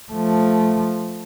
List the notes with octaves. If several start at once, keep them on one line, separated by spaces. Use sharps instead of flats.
F3 A3